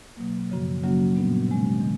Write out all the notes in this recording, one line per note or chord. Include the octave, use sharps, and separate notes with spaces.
B2 F#3 A#3
F#2 C#3 F3
C#3 F#3 A#3 C#4 F#4
A#2 G3 B3 D4
C3 D#3 G#3 C#4
D#3